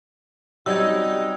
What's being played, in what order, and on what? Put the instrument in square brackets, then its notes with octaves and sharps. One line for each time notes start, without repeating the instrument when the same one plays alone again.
[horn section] C3 C#4 D#4 [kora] F#3 G3 [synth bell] E6 G#6